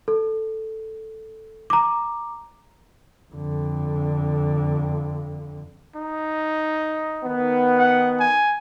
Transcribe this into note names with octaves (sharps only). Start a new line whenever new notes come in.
A4
A#5 D6
F2 D3
D#4
D#3 B3
F#5
G#5